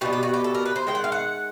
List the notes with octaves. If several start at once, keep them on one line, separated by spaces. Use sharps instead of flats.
B2 G3 B3 D#4 G4
G4
F#4
G4
A4
A#4
B4
C5
D#3 G#3 G5
F#5
F5
F#5